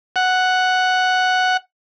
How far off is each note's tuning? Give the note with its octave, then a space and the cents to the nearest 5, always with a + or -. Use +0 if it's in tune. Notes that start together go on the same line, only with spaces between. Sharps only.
F#5 +0